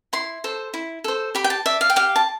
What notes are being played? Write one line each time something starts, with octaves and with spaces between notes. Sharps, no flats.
E4 C6
A4 C5
E4
A4 C5
G4 B5
G5
A5
D5 E5
F5
G5
G4 F5
A5